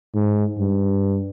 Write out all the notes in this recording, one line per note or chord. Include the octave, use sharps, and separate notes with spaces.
G#2
G2